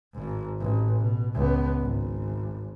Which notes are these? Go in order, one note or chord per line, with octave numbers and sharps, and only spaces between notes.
G#1 G#2
A1
B2
C#2 B3
G#1